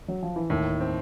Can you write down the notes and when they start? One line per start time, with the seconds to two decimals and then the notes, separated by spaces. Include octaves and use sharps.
0.08 F#3
0.23 F3
0.36 E3
0.50 D#2 A2 D#3
0.80 C4